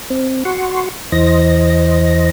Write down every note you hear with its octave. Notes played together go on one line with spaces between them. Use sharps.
C4
F#4 F#5 C6 C#6
E2 E3 C5 D#5 A#6